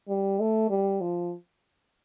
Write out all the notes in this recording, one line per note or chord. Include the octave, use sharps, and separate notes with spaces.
G3
A3
G3
F3